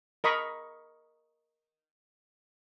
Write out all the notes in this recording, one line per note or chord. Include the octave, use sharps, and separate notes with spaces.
A#4 D#5 B5 C#6